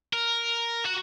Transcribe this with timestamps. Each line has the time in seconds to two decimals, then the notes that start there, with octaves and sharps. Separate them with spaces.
0.13 A#4
0.85 F#4